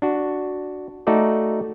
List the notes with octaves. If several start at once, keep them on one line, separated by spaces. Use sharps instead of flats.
D4 F#4
A3 D#4 F#4 A4 D5